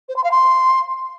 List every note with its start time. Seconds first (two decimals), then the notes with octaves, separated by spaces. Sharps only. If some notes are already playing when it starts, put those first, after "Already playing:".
0.08 C5
0.16 C6
0.23 F5
0.31 C6